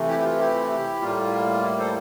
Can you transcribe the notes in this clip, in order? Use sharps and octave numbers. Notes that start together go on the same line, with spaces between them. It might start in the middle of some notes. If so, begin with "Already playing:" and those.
Already playing: C3 E3 A3
E4 G4
G4
F4
E4 G4
A2 G3 A#3 F4
E4
A4 C5